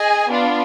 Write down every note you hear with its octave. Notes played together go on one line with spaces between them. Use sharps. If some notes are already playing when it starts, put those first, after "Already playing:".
Already playing: G#4 D#5 G#5
B3 D4 F4